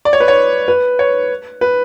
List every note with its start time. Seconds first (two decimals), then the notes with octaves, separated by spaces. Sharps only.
0.05 D5
0.13 C#5
0.20 B4
0.28 C#5
0.68 B4
0.99 C#5
1.61 B4